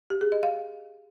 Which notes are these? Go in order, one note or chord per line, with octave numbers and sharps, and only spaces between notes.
G4
G#4
D#5
F5